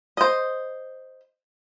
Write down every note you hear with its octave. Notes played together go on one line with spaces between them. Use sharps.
C5 D#5